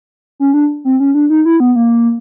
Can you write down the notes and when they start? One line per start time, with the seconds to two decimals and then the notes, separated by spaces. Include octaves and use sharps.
0.40 C#4
0.54 D4
0.85 C4
1.00 C#4
1.14 D4
1.30 D#4
1.45 E4
1.60 B3
1.76 A#3